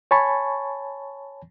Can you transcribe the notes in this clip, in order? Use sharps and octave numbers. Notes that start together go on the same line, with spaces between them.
C#5 G#5 A5 B5 C#6